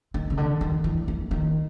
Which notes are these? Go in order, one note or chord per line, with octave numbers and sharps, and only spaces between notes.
D#3
C#3
D3
D#3
E3
E3
D#3